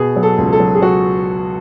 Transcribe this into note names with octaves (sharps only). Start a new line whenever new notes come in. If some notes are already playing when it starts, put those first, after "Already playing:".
Already playing: B2 G#4
F#3
A4
C#2
A4
F#3
G#4
F#3 F#4